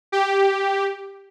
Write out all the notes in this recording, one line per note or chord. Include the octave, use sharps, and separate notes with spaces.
G4